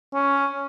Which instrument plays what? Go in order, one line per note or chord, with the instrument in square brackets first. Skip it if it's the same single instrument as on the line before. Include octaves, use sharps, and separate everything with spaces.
[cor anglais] C#4